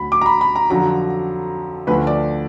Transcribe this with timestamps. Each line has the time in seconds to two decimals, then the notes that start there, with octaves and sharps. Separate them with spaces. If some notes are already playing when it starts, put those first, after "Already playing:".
Already playing: D2 D3 F#3 B5
0.12 D6
0.21 A#5
0.26 B5
0.41 B5
0.56 A#5
0.70 F2 D3 F#3 A#5
1.87 D2 D3 F3 B4
2.07 D5